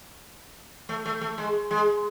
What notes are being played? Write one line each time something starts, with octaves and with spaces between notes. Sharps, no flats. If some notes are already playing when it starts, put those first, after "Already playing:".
A3
A3
A3
G#3
G#3